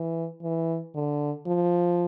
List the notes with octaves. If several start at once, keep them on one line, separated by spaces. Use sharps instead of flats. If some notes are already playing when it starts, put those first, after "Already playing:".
Already playing: E3
E3
D3
F3